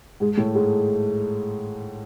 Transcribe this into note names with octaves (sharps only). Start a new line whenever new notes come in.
G#2 G#3
A2 A3
G#2 G#3